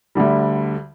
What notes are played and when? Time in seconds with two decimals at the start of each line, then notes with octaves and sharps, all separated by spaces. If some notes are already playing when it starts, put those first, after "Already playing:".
0.15 D2 D3 G3